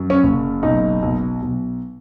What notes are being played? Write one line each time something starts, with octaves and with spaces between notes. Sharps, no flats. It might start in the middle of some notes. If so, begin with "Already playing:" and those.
Already playing: F#2
C#4
F#1
B1 D#4
B1
B1